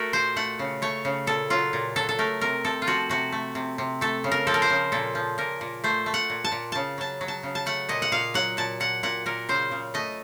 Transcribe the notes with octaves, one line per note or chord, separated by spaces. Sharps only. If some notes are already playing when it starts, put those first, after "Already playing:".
Already playing: A3 F#4 A#4
A#2 C5
A3 F#5
C#3
A3 C#5
C#3
A#2 A4
F#3 F4
A#2
F#3 A4
A4
A3 A#4
C3 A#4
C3 A4
F4
F3 F#4
C3 F#4
A3
C3
C3
A3 A4
C#3
A#4
F3 A4
A#4
C5
C#3
A#2 A4
F3
A#2 A#4
A#2
A3 C5
A3
F#5
A#2
A5
A#2
C#3 A5
F#3 A5
F#3
A5
C#3
A5
A3 F#5
A#2 D#5
F#5
A#2 F5
F#3 F#5
A#2 A5
A#2 F#5
A#2 F#5
A#2 A#4
C#3 C5
C#3
A3 D#5